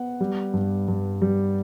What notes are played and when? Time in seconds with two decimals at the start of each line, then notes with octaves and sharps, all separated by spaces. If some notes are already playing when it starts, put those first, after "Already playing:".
Already playing: B3 F#5
0.20 G3
0.54 G2
0.88 G2
1.22 G3